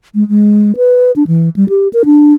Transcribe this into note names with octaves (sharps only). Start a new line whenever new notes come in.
G#3
G#3
B4
D4
E3
G3
G4
A#4
D4